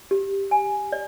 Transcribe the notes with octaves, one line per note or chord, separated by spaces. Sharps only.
G4
G#5
D5